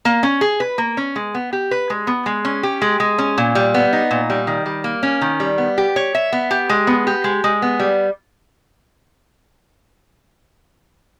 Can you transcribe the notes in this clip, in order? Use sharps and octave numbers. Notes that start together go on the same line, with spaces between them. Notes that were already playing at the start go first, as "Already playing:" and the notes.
A#3
C#4
G#4
B4
A#3
C#4
G#3
B3
G4
B4
G#3
B3
G#3
C#4
G4
G#3
G#3
C#4
A#2
G3
B3
D#4
A#2
G3
D#3
G3
A#3
C#4
D#3
G3
B3
G4
C#5
E5
B3
G4
G#3
B3
G4
G#3
G#3
B3
G3